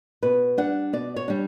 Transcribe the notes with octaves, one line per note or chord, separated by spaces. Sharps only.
B2 B4
G3 D4 F#5
B2 D5
C#5
G3 D4